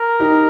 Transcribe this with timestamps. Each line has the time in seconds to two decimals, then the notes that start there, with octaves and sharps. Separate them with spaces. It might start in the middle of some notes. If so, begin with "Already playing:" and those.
Already playing: A#4
0.20 D#4 G4